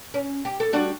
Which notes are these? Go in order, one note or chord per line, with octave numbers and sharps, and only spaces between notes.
C#4
G4
A4
G3 D4 F#4